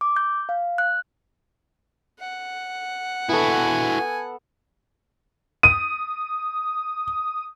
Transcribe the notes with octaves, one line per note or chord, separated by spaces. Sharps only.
D6
G6
F5
F#6
F#5
B3 E4 F#4 A4 G#5
D#6 D#7